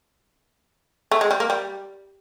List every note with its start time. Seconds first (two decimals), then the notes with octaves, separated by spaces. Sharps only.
1.11 A3
1.21 G#3
1.31 G3
1.40 A#3
1.50 G3